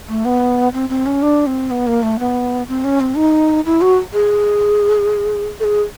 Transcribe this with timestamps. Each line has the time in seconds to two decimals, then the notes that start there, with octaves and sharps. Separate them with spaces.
0.09 A3
0.25 B3
0.74 C4
0.89 C4
1.06 C#4
1.22 D4
1.47 C4
1.71 B3
1.87 A#3
2.03 A3
2.19 B3
2.68 C4
2.84 C#4
3.00 C4
3.17 D#4
3.66 E4
3.81 F#4
4.14 G#4
5.60 A4
5.64 G#4